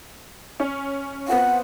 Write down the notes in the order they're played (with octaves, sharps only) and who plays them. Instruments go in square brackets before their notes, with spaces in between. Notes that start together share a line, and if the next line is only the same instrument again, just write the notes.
[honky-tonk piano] C#4
[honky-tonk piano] B3 C4 F4 [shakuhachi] F#5